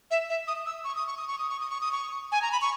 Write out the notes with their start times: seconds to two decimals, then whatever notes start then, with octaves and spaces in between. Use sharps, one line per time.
0.11 E5
0.30 E5
0.48 D#6
0.66 E6
0.84 C#6
0.96 D#6
1.07 C#6
1.17 D#6
1.28 C#6
1.39 D#6
1.49 C#6
1.60 D#6
1.70 C#6
1.81 D#6
1.92 C#6
2.32 G#5
2.42 A#5
2.52 B5
2.62 C#6